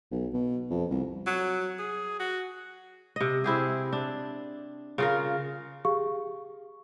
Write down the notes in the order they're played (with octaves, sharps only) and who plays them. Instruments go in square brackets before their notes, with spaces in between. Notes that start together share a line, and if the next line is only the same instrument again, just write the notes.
[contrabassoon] B1
B2
F2
C2
[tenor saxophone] F#3
G#4
F#4
[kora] C3 D#5
C4 E4 G4 G#4
D4
C#3 F4 A#4
[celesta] G4 G#4 F5 C#6